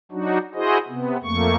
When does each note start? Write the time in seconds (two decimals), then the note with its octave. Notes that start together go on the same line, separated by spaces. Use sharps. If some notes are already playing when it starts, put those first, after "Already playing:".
0.12 F#3 D4 D#4 F#4
0.54 E4 F#4 G#4 C5 D#5
0.88 C3 B3
1.23 F2 A3 A#3 C#6